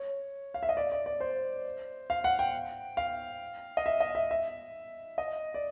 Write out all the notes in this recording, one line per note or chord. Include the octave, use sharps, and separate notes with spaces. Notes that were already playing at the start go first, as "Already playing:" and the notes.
Already playing: C#5
F5
E5
D#5
D5
D5
D5
C5
F5
F#5
G5
F5
D#5
E5
D#5
E5
E5
D#5
D5